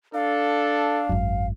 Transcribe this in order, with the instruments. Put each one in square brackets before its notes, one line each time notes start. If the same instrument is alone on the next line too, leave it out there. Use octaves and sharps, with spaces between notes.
[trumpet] D4 [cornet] A4 [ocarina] F5
[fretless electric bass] G#1 F#2